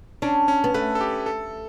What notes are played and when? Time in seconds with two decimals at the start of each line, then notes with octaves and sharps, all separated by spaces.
0.22 C#4 D4
0.48 C#4
0.64 B3
0.74 A3 B4
0.95 A4
1.01 G4
1.26 A4